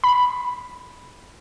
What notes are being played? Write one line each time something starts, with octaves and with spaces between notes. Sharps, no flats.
B5